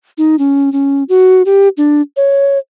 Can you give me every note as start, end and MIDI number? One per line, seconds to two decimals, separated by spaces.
0.18 0.36 63
0.39 0.72 61
0.72 1.03 61
1.09 1.42 66
1.46 1.68 67
1.77 2.01 62
2.17 2.58 73